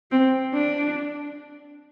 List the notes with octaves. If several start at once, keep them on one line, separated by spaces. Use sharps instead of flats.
C4
D4